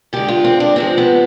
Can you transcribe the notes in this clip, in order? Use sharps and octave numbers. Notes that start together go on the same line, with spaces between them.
D3 G#3 G4
F4
C4
D4
C3 F3 G#3 C4
B3